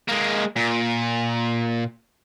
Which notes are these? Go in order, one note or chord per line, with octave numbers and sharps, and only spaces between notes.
G#3 A#3
A#2